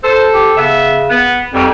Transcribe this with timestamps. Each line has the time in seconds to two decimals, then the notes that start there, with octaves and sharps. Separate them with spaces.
0.04 A4 C5
0.34 G4
0.57 C#3 B3 E5
1.10 B3
1.54 F2 G#2 B2 G3